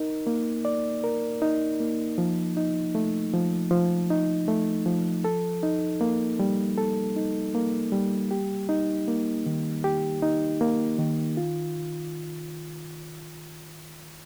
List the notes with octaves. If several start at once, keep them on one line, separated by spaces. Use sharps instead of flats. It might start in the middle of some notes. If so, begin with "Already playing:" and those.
Already playing: D#4 A#4
A#3
D5
A#4
D#4
A#3
F3
D#4
A3
F3
F3
D#4
A3
F3
A4
D#4
A#3
G3
A4
D#4
A#3
G3
G4
D#4
A#3
D#3
G4
D#4
A#3
D#3
F4